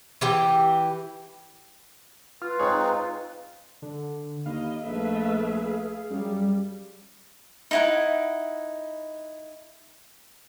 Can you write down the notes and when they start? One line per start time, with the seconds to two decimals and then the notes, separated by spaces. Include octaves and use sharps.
0.21 E3 G4 G5
2.42 F4 B4
2.59 G#3 C4 D#4 G#4 C#5
3.82 D3
4.46 D#2 D#5 F5 B5
4.86 A#1 A3 G#4 B4 E5
6.10 F#2 G3
7.71 D#4 E4 F#5